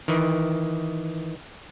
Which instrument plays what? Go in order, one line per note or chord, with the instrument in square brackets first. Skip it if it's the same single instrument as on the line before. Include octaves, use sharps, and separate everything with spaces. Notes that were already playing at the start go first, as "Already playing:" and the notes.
[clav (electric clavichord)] D#3 E3